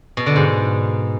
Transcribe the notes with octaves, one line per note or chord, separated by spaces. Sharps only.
B2
D3
G#2